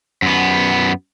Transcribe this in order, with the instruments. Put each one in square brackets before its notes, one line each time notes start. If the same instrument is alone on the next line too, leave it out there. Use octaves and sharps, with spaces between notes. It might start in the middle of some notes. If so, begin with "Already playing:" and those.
[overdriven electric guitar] F#2 B3